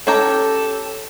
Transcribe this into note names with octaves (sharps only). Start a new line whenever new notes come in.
C#4 G4 A4 A#5